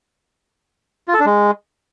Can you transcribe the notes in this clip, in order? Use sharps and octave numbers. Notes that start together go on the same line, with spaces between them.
F4
A4
D4
G#3